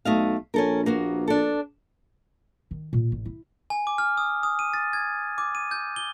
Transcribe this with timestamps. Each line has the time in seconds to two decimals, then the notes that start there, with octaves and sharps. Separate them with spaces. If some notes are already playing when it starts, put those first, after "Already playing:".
0.05 B1 A3 D#5 F5
0.54 A#1 C#4 A4 A#4
0.86 A#3 B3 F#4
1.28 D4 A4
2.71 D#3
2.93 A#2
3.12 A1
3.25 E4
3.70 G#5
3.87 D6
3.98 F6
4.17 D#6
4.43 D#6
4.59 D#7
4.74 A6
4.93 G#6
5.38 D6
5.55 D#7
5.71 G6
5.96 G7